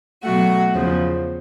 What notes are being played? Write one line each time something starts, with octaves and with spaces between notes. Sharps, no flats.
B2 F#3 A3 F#4 F#5
E2 C#3 F3